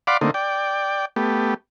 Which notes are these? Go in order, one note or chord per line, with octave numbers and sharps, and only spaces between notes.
D5 F5 F#5 B5 C6 D6
D3 A3 A#3 C4 D#4
D5 G5
A3 B3 G4